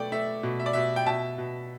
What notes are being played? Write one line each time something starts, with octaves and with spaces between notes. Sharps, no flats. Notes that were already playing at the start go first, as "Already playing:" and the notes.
Already playing: B2 A3 D5 G5
A3 E5
B2
E5
D5
B2 E5
G5
B2 E5 A5
B2